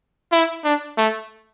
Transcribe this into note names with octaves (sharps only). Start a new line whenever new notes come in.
E4
D4
A3